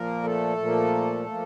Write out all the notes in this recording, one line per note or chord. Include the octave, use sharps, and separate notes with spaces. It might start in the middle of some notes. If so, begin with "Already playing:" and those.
Already playing: A#2 F3 A#3 A#4
A3 A4
A#2 F3 A#3
F3 A#3